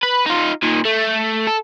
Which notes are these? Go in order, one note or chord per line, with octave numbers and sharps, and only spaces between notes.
B4
D#4 F4
A#2 D#3
A3
A4